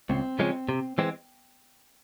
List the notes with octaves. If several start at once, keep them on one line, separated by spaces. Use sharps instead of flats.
C#2 C4
C#3 F3 G#3 C#4
C3
E3 G#3 C4